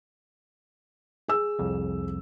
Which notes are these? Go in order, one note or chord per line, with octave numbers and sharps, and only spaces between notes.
G#4 E6
C2 F2